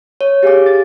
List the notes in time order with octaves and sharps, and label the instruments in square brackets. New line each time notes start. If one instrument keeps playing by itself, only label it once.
[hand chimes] C#5
G4 G#4 F5 G#5 D6
A6